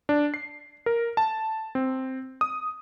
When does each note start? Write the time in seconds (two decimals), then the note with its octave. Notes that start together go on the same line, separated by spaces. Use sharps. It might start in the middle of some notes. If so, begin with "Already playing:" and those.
0.09 D4
0.34 C7
0.86 A#4
1.17 A5
1.75 C4
2.41 D#6